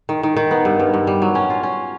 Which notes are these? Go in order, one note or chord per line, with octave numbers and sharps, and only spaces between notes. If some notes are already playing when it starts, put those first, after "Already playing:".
D#3
D#3
D#3
B3
G2
G2
G2
G3
F#3
C#4
F4
C#4